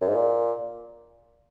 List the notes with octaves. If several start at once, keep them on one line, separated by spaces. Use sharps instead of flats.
F#2
G#2
A#2